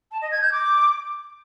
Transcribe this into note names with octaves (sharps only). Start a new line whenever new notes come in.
A5
D#5
G#6
G6
D6